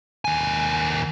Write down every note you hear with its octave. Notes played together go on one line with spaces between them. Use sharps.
D#2 G#5